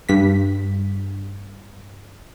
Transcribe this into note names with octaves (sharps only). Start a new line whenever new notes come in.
G2 B6